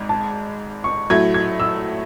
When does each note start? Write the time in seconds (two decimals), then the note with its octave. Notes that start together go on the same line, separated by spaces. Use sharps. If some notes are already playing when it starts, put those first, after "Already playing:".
Already playing: G#1 G#2 G#3
0.09 A5
0.84 C#6
1.10 A2 F#3 A3 G#6
1.34 G#6
1.60 E6